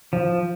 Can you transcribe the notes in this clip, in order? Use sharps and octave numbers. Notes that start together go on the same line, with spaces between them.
F3